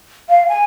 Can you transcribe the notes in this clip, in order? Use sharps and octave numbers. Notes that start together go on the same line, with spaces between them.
F5
G#5